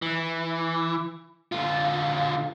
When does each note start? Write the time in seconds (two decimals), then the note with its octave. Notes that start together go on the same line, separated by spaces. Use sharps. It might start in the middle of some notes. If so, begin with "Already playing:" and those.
0.02 E3
1.52 D3 F4